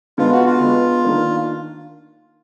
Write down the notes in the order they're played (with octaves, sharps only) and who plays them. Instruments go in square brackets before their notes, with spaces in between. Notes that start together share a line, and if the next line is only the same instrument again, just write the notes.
[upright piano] D3 G#3 B3 [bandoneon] F4
[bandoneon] F#4
F4
[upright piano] D3 G#3 B3
D#3 A#3 D4